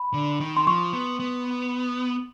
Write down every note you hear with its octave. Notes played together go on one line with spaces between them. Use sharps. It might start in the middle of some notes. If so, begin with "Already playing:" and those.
Already playing: B5
D3
D#3
C6
F3 C#6
B3
B3